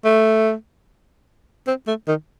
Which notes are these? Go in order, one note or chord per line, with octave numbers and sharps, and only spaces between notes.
A3
C4
A3
D#3